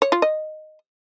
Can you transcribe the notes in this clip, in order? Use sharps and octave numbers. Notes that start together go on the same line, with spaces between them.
C#5
F4
D#5